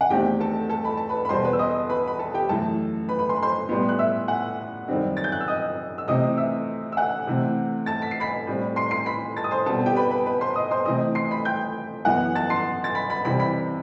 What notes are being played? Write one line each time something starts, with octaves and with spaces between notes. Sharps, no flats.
F#5
E2 D#3 A3 C4 G4 G5
A4 A5
A4 A5
B5
A5
B4 B5
B5
E2 B2 G3 C5 C6
B4 B5
E6
D#5 D#6
B4 B5
B5
A4 A5
G4 G5
F#2 E3 A3 A4 A5
B4 B5
B4 B5
C6
B5
C5 C6
A2 G3 B3
F#6
E5 E6
F#5 F#6
F#2 D#3 G3 C4
A6
G6
F#6
E6
D#5 D#6
E6
C3 E3 A3 C4 D#5 D#6
E5 E6
E6
F#5 F#6
C3 E3 A3 C4
A5 A6
B6
C7
B5 B6
A2 G3 C4
C6 C7
C6 C7
B5 B6
A5 A6
D#6
C5 C6
B2 G3 C4 A4 A5
G4 G5
B4 B5
B4 B5
B4 B5
C5 C6
D#5 D#6
C5 C6
C3 E3 A3 C4 D#5 D#6
C6 C7
B5 B6
G5 G6
F#2 E3 B3 F#5 F#6
A5 A6
C6 C7
A6
B5 B6
B5 B6
C3 E3 G3 C4 B5 B6
B5 B6